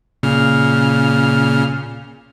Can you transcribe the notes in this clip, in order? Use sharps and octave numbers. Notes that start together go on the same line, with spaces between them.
A#2 C#3 F6